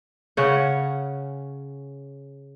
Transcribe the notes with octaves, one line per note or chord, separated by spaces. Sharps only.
C#3 C#4 F#5